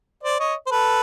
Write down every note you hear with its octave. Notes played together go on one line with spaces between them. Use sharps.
C5 D5
C#5 D#5
C5
A4 B4